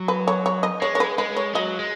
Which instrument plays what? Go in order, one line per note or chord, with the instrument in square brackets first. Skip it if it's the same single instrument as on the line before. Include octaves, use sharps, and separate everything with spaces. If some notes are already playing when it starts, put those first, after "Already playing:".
Already playing: [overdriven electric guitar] F#3
[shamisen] B4
C#5
C#5
D#5
[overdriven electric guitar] G#3 [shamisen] C#5
[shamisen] C#5
B4
[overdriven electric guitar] G#3 [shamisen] B4
[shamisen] C#5
[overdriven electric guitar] F#3 [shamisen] D#5
[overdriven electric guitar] G#3